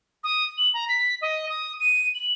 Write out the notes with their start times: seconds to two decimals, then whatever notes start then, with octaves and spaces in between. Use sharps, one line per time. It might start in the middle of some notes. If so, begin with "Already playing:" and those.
0.24 D#6
0.58 F#7
0.74 A#5
0.89 B6
1.22 D#5
1.49 D#6
1.80 D#7
2.15 F#7